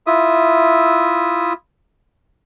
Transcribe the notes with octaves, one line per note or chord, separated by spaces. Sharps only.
E4 F4 E5 D#6